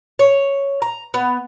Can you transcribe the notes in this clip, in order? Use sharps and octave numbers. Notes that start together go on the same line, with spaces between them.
C#5
A#5
B3